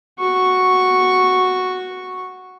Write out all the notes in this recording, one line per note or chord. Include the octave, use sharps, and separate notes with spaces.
F#4 C#6